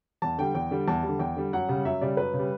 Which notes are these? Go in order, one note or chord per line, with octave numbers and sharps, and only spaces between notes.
E2 A5
D3 G3 G5
E2 G5
D3 G3
E2 A5
G3
D3
E2 G5
D3 G3
F#2 F#5
C#3 G3
F#2 E5
C#3 G3 D5
F#2 B4
C#3
G3